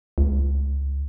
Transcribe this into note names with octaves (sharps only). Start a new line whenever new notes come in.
C#2